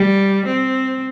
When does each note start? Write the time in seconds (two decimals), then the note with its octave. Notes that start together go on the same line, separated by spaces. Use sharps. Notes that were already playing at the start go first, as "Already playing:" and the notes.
Already playing: G3
0.46 C4